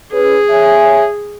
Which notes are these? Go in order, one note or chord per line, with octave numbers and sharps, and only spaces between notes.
C#4 G#4 B4
C#5 E5 G#5